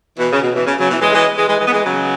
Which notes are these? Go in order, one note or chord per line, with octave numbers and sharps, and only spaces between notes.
B2 E3
C#3
B2
B2 E3
C#3
C#3 F#3
B2 E3
E3 G#3
E3 G#3
E3 G#3
E3 G#3
E3 G#3
B3
E3 G#3
C#3 F#3